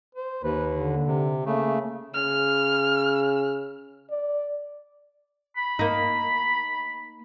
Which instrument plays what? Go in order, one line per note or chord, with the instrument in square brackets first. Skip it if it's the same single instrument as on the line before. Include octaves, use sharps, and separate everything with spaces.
[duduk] C5
[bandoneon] D#2 [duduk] B4
[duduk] D3
[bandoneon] C3
[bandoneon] C#3 A3 [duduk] A#3
[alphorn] C#3 [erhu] F6
[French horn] D5
[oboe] B5
[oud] A#3 D#4